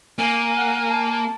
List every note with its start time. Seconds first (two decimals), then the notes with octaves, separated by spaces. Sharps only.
0.19 A#3 G#5
0.57 F#5
0.88 A5